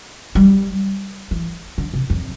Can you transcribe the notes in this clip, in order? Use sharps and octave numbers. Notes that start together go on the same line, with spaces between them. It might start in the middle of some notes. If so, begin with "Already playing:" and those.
G3
E3
D3
C3
F2